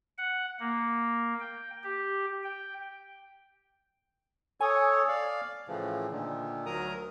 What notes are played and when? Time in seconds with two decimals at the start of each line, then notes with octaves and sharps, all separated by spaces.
0.18 F#5
0.59 A#3
1.40 G5
1.84 G4
2.44 G5
4.61 A4 C#5 G#5 D#6
5.08 D5 F5
5.68 A2 C#3 E3 F3
6.12 A#2 D3 D#3
6.66 D2 F#3 A#4 A#5 D#6